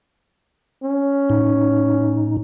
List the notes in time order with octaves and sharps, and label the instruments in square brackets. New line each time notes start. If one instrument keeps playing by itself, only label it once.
[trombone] C#4
[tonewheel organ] A2 D#4